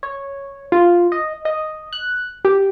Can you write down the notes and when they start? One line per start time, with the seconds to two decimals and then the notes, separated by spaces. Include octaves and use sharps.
0.03 C#5
0.72 F4
1.12 D#5
1.45 D#5
1.93 F#6
2.45 G4